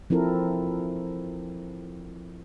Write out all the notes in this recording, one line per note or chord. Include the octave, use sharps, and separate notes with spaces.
F3 C4 E4 A4 A#4